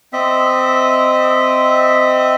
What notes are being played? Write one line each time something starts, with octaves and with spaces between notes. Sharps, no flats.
C4 D#5 E5